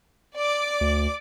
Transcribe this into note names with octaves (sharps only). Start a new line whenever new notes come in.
D5 D6
D2